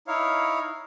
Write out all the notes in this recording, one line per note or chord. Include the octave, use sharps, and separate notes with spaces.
D#4 E4 C#5 F5